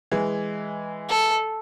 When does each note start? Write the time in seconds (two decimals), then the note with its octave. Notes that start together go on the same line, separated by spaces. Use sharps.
0.11 E3 G#3
1.10 A4